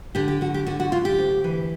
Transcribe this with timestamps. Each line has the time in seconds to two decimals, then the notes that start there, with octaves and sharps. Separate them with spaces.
0.15 D3 G4
0.28 G4
0.41 D3 F#4
0.54 G4
0.66 D3 F#4
0.80 F#4
0.92 D3 F4
1.05 G4
1.18 D2
1.44 E3